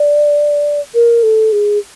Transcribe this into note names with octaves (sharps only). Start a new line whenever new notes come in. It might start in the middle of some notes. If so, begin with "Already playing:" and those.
Already playing: D5
A#4
A4
G#4